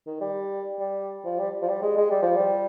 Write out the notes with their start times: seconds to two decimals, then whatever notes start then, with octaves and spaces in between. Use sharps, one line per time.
0.07 D#3
0.21 G3
0.79 G3
1.25 F3
1.39 G3
1.62 F3
1.68 G3
1.83 G#3
1.97 G#3
2.11 G3
2.22 F3
2.36 G3